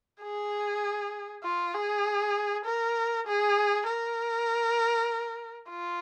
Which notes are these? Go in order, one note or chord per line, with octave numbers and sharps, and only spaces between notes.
G#4
F4
G#4
A#4
G#4
A#4
F4